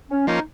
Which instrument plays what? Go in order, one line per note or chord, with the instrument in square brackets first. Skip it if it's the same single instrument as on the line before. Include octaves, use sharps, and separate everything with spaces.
[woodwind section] C#4
[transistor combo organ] F3 A#3 C#4 [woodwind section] D#4